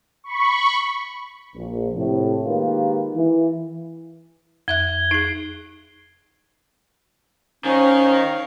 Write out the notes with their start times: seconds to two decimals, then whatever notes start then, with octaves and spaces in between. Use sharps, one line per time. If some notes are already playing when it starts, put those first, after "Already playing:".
0.24 B5 C#6
1.55 A#1
1.96 A2 C3
2.46 D#3 G#3 A#3 F4 G4 B4
3.15 E3
4.68 F2 E5 F#6 G#6 G7
5.11 D#4 G#4 C7
7.65 D#3 C#4 D#4 C5 C#5 F5